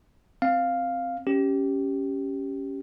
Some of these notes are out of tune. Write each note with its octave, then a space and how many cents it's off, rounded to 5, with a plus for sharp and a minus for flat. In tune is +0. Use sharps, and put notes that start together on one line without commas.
C4 +0 F5 +0
C#4 +0 G4 -10